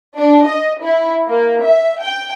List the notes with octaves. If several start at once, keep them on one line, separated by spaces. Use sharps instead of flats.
D4
D#5
E4
A#3
E5
G5